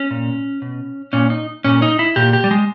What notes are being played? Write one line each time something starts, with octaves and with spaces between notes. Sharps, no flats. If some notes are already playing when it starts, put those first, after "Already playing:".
Already playing: C#4
A#2
B2
A#2 C#4
D#4
A#2 C#4
D#4
E4
A#2 G4
G4
G3
G#3